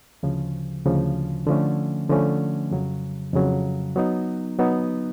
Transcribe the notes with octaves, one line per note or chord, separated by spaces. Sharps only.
D2 C#3 F3
D2 C#3 F3
D3 F3 A3 C#4
D3 F3 A3 C#4
F2 C#3 F#3
F2 C#3 F#3
F#3 B3 D#4
F#3 B3 D#4